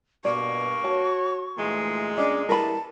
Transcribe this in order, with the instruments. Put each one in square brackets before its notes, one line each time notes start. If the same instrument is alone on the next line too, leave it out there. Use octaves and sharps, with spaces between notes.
[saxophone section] G2 A#3 [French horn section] B2 [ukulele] D5 [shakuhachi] C#6
[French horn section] F#4 C#5 [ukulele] A5
[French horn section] D2 E3 A3 [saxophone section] A#2 G#3
[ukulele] C#4 D4 D#5 [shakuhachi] D6
[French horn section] E2 G3 E4 [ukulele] A#4 B4 B5 [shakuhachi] A5